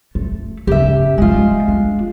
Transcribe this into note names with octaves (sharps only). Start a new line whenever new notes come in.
A3
F#2 C#3 G4 E5
F3 G3 G#3 F4
D4